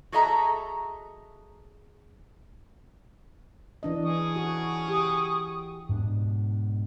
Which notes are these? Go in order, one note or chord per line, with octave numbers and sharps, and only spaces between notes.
F#4 G#4 A4 D#5 E5 A#5
E3 D4 D#5
G#4 C#6 D#6
F#4
G4
G#2 B2 D4